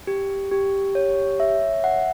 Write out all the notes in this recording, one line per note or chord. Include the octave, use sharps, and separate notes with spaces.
G4
G4
C#5
E5
F#5